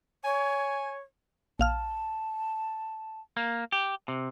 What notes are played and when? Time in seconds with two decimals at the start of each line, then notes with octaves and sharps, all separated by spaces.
0.24 C#5 G#5
1.59 A#1 F5 A5 F6
3.37 A#3
3.72 G4
4.08 C3